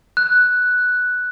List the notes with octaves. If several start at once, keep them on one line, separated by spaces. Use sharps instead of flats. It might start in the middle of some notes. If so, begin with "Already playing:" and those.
F#6